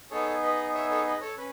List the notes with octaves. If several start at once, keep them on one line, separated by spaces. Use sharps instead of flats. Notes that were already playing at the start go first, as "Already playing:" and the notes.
B3 D#4 G#4 A4 C#5
B4 D#5
C#5 E5
A4 C#5
B4 D#5
A4 C#5
C#4 B4